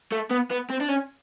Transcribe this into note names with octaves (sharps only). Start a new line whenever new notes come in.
A3
B3
B3
C4
D4
C#4